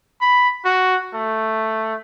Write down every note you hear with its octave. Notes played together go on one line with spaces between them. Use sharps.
B5
F#4
A3